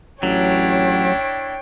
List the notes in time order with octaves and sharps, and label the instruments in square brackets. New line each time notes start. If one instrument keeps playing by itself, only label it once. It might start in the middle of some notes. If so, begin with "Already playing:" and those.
[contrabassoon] A1 [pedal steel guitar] F#3 [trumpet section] D4 E4 [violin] C#5 G5